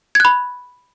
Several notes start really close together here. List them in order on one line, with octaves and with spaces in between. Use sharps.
G#6 F#6 B5